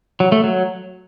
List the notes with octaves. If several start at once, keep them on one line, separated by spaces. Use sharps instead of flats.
F#3
A3
F#3